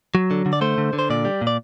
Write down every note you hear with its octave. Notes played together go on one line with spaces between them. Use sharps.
F#3
D3
D3
D5
A3 C5
D3
D3
C5
A#2 D5
G3
A#2
D5